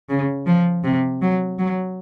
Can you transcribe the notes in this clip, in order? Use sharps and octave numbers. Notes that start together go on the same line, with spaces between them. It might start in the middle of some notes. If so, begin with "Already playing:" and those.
C#3
F3
C3
F#3
F#3